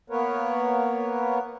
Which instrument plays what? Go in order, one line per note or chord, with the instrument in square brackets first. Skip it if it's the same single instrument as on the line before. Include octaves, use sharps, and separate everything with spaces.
[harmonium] A#3 B3 A#4 B4 C#5